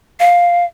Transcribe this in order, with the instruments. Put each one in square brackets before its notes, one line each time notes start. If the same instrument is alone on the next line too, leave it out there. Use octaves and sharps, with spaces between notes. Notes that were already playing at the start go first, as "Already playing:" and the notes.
[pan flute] F5